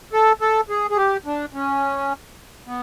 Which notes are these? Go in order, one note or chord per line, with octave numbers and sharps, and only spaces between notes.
A4
A4
G#4
G#4
G4
D4
C#4
B3